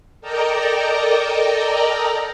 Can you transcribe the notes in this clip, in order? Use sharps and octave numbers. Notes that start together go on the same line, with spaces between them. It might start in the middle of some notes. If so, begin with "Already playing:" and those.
A4 A#4 D5 D#5 G5 A#5